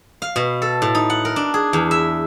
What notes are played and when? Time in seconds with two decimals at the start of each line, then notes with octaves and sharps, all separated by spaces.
0.22 F5
0.36 B2
0.62 A4
0.82 A2
0.95 D#4
1.10 F#5
1.25 A#4
1.36 D4
1.54 G#4
1.73 E2
1.91 E5